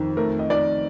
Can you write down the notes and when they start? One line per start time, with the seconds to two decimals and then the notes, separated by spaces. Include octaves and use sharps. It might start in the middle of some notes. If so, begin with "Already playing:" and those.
Already playing: F2 D#3
0.17 A3 A#4
0.39 D#5
0.50 D#3 D5